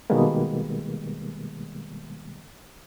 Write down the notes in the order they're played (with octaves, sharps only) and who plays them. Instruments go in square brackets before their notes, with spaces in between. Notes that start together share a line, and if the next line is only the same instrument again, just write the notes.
[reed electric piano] B2 D#3 G3 G#3 A#3 B3